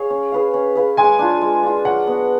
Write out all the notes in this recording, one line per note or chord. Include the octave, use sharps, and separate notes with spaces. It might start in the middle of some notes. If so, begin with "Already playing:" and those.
Already playing: G#4 C#5 F5
C#4
G#4 B4 F5
C#4
G#4 B4 F5
G#3 G#5
D4 F4
G#3
D4 F4
F#3 F#5
B3 F#4